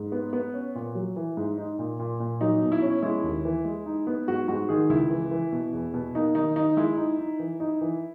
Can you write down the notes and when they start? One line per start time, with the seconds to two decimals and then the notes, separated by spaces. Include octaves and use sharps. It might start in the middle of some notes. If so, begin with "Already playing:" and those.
Already playing: G#2
0.12 B3
0.33 B3
0.54 C#4
0.75 A#2
0.95 F#3
1.16 E3
1.37 G#2
1.58 D#4
1.79 A#2
1.99 A#2
2.20 A#2
2.41 F#3 D#4
2.62 B2
2.72 E4
2.82 C#4
3.02 G#3 E4
3.24 D#2
3.45 E3
3.65 G#3
3.86 D#4
4.07 B3
4.28 G#2 F#4
4.48 G#2 F#4
4.69 D#3 G#4
4.89 C#2 E4
5.10 E3
5.31 E3
5.52 B2
5.73 E2
5.94 B2
6.15 A#3 D#4
6.35 D#3 D#4
6.56 D#4
6.77 G#3 E4
6.97 D#4
7.19 D#4
7.39 E3
7.60 D#4
7.81 E3